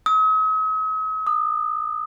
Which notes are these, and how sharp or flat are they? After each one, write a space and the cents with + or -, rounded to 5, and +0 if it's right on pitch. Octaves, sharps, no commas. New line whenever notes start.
D#6 +45
D#6 -35